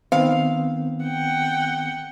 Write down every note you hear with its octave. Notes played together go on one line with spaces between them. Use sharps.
D#3 B3 C4 F5
F#5 G5